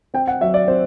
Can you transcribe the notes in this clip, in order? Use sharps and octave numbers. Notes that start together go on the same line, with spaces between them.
C4 G5
F#5
F#3 E5
D5
C4 C5